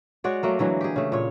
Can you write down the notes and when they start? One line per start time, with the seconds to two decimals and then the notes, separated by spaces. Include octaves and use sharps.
0.24 G#3 F#4 C#5 D5
0.43 F#3 A3 A#3
0.59 D3 E3 F#3 G#3
0.81 G4 G#4
0.96 C#3 A3
1.12 A#2 C#5